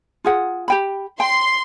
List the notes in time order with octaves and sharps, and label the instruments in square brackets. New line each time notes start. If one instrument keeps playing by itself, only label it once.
[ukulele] F4 G#4 F#5
G4 G5 B5
[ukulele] G5 [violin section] C6